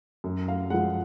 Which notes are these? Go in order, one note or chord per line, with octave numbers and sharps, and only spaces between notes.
F#2
F5
F3 G#3 F#5